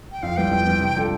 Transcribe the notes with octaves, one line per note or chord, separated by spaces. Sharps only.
G5
F2 F5
E3 G3 B3 G5
F2
E3 G3 B3
C3
G3 D4 F4 A4